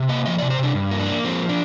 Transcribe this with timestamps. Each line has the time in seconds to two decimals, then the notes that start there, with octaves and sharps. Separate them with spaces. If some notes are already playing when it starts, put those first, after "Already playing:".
Already playing: C3
0.09 A#3 D#5
0.26 F3 D#5
0.38 D5
0.42 C3
0.50 C5
0.59 C3 D4
0.75 G2
0.91 A#3
0.99 D4
1.08 A#3
1.24 F3 C4
1.49 D4